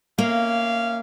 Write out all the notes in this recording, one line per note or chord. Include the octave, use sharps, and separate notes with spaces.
A#3 C#4 E5 F5